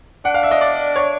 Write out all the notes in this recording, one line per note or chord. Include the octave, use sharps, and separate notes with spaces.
D4 F#5
F5
E5
D#5
D5
C#5